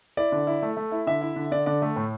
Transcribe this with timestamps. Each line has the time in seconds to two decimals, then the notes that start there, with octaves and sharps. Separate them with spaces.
0.17 E4 D5
0.32 D3
0.47 E4
0.62 A3
0.77 A3
0.92 E4
1.07 D3 E5
1.21 E4
1.36 D3
1.51 D3 D5
1.66 D3 D5
1.82 A3
1.96 A2